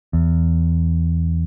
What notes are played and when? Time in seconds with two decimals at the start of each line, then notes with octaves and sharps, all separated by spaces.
0.13 E2